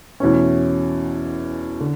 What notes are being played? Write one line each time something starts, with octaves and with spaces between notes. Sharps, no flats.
E2 B2 A3 C#4
D3